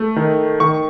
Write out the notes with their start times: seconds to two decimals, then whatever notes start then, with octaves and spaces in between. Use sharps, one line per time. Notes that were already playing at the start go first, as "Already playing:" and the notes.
Already playing: A3
0.16 D#3
0.60 D#3 C#6